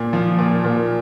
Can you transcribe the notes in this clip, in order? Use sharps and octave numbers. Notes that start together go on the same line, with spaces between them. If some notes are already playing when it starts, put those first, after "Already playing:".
Already playing: A#2
F3
A#2
A#2